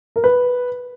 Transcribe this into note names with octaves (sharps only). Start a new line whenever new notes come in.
A#4
B4